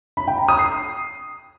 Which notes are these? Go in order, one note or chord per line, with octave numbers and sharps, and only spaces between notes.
B5
G5
A#5
D#6
C7